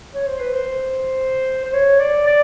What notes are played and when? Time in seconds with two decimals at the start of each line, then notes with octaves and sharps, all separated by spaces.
0.14 C#5
0.27 C5
0.40 B4
0.53 C5
1.65 C5
1.73 C#5
2.00 D5
2.26 D5